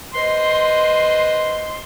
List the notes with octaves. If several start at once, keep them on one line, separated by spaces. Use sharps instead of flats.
B4 C5 D#5 C6